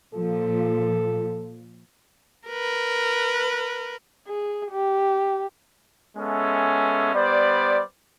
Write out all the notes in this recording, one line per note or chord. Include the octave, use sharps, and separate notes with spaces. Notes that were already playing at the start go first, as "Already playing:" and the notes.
A#2 F3 A4
A#4 B4
G#4
G4
G#3 B3 C#4 A4 E5
G3 B3 C5 D5